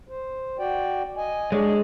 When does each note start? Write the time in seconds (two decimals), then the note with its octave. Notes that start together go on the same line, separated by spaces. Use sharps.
0.09 C5
0.59 F#4 D5 G5
1.17 D#5 G#5
1.52 G#3 D4 C#5 D5